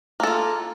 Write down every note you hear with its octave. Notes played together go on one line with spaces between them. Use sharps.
A#3 F4 A4